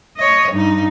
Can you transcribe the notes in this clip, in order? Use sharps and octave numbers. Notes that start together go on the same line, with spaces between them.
C#5 D#5
G2 D#4